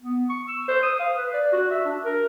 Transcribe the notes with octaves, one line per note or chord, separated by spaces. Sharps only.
B3
C#6
E6
C5
D#6
F5
B4
D5
F#4
E5
D4
A#4